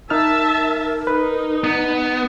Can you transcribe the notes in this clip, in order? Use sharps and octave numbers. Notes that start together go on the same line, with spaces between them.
D#4 A#4 E5 A5 F6
D#4 B4
B3